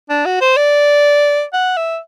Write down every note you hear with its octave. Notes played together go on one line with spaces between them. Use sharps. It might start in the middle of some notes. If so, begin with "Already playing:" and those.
D4
F#4
C5
D5
F#5
E5